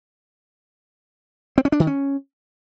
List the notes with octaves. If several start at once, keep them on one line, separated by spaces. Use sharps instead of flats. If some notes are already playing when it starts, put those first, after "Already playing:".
C4
C#4
D4
D#3
C#4